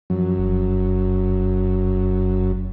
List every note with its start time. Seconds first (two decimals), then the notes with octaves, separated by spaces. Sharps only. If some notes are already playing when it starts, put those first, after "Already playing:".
0.10 F#2 F3
0.38 F1